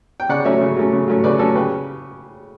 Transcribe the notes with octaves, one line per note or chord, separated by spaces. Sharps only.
G5
C#3 D5 F#5
F#3 A3 C#4 C#5 E5
C#3
F#3 A3 C#4
C#3
F#3 A3 C#4
C#3 B4 D5
F#3 A3 C#4 A4 C#5
C#3 G4 B4